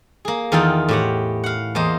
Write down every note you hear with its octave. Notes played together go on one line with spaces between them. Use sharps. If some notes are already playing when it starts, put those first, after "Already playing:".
A#3 G#4
E2 D#3 F4 A4 A#4 G5
A2 G4 F#5
F5 F#5
E2 A#3 C5 D#5